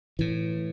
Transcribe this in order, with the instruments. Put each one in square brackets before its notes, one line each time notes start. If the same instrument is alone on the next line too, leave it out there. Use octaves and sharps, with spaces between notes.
[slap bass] A2 E3